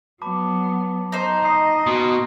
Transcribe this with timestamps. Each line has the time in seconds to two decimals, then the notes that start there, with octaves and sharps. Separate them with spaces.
0.22 F#3 B3 A5 B5 D6
1.12 D#4 C5
1.44 D#5 A#5 D#6 C7
1.86 B2 C6 D#6